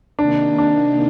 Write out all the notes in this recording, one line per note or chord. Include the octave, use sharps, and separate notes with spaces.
C3 D#3 A#3 D4 D#4
D4